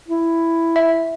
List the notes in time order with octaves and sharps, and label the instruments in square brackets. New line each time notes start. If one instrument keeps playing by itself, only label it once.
[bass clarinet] E4
[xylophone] E5